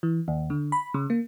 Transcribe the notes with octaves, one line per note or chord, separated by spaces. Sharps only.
E3
D#2
D3
B5
C#3
A#3